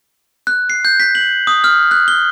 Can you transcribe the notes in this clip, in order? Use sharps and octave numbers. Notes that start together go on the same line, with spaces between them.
F#6
C7
G6
B6
F#7
D#6
F6
F#6
G7